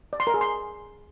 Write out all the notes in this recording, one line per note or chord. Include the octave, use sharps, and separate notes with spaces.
D5
C6
A#4
G#4
C6